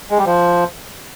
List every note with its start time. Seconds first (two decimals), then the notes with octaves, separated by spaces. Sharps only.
0.11 G#3
0.18 G3
0.26 F3